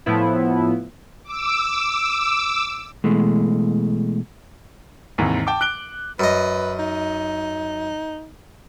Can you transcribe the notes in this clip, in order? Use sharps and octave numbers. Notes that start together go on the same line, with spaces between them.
A2 F3 B3 E4
D6 E6
B2 E3 G#3 A3
D#2 G#2 C3 E3
G5 A5 D6
F#6 D7 G7
F#2 B4 D#5
D#4